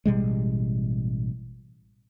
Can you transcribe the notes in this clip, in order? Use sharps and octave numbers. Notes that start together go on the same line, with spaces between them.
A1 B2 G3 G#3